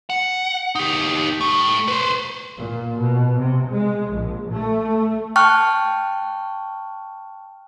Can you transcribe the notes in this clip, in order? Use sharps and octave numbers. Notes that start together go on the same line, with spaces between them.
F#5
D#4 G4
G3 A3
B4 C5
A#2
B2
C3
G#3
A#1
A3
G5 A5 C#6 F6 F#6